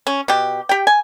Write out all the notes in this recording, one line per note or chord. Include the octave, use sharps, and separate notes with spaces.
C#4
B2 G4
G4 G5
G#5